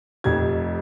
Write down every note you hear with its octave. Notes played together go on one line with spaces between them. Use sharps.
F1 F2 C3 G#6